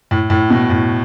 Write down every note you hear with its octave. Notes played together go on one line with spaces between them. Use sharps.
A2
A2
B2
A2